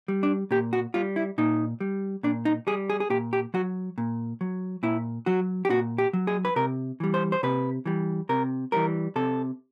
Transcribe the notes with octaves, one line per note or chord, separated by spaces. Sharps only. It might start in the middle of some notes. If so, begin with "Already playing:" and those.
G3
D4
A#2 G4
F#4
G3 F4
E4
A#2 D#4
G3
A#2 D4
D#4
G3 G#4
G#4
G#4
A#2 G4
G4
F#3 F#4
A#2
F#3
A#2 E4
F#3 F#4
G4
A#2 F#4
G4
F#3
G#4
B4
C3 A#4
E3 G3
C5
C5
C3 B4
E3 G3
C3 A#4
E3 G3 A#4
C3 A4